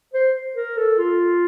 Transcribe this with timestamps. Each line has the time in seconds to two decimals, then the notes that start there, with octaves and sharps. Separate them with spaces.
0.14 C5
0.56 A#4
0.78 A4
0.99 F4